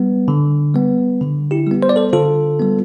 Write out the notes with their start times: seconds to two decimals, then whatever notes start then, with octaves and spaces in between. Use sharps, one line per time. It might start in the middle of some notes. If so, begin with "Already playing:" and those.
Already playing: G3 B3
0.28 D3
0.74 G3 B3
1.21 D3
1.51 E4 G4
1.66 G3 B3
1.83 C5
1.89 D5
1.96 A4 C5
2.13 D3 F4 A4
2.60 G3 B3